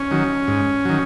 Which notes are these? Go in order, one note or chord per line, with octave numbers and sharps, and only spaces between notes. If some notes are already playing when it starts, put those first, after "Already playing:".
Already playing: C#4
D#3 F#3
G#2
D#3 F#3